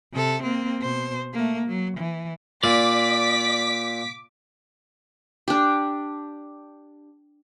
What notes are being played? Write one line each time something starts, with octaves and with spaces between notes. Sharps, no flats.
C3 A4
A#3 C4
B2 C5
A3 A#3
F#3
E3
A#2 D5 D6 B6
D4 G4